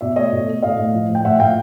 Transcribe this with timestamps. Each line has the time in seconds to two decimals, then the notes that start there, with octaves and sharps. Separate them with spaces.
0.01 B2 D5 E5
0.16 A3 C#5 D#5
0.32 B2
0.47 A3
0.63 A2 D#5 F5
0.79 A2
0.94 F3
1.09 F3
1.15 G5
1.25 A2 E5 F#5
1.40 A2 F5 G5